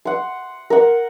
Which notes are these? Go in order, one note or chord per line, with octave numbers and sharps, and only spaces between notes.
F#5 C6
A#4 F#5